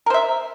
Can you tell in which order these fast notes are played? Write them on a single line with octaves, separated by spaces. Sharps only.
A#4 C5 E5